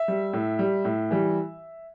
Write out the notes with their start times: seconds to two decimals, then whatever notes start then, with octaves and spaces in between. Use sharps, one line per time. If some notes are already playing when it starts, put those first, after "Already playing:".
Already playing: E5
0.08 G3
0.33 A2
0.59 G3
0.85 A2
1.11 E3 G3